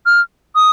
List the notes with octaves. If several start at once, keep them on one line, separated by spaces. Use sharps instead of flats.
F6
D#6